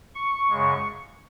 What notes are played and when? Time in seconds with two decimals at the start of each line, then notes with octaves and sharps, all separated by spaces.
0.15 C#6
0.50 F#2 C#3 G#3